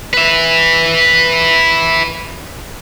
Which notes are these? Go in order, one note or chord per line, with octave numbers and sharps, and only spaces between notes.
B4 E5